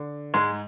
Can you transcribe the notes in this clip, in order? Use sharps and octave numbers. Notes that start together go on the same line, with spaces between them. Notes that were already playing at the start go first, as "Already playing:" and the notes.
Already playing: D3
G#2 G#3